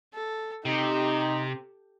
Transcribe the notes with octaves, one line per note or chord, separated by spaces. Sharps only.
A4
C3 D#4 G4